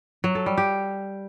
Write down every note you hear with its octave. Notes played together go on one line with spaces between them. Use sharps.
F#3
A4
G3
G4